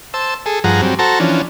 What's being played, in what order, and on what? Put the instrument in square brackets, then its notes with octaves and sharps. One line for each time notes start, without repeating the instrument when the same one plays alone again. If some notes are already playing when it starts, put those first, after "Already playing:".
[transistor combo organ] C5 A5 E6
G#4 A4
G2 F3 G#4 F#5 A#5
F#3 G3 C4
F#4 A4 C5 A5 A#5
E3 F3 C#4 D4